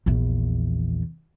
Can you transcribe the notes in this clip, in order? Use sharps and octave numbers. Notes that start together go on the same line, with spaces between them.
A#1 E2